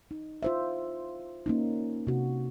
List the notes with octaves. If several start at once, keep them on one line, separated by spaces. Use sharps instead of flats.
D#4
F4 C5 E5
A#3 C#4 D#4
C3 F#4